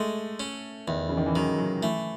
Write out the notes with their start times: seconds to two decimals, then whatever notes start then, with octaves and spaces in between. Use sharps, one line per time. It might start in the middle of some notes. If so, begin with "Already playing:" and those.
Already playing: G#3 A3
0.40 C#4
0.87 E2 D#3
1.09 C#3
1.17 D#3
1.26 E3
1.35 D#3 F#3
1.58 F#3
1.82 E3 A3